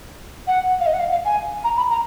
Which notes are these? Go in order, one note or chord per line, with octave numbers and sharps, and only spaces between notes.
F#5
F5
D#5
F#5
F5
F5
G#5
A#5
B5
A#5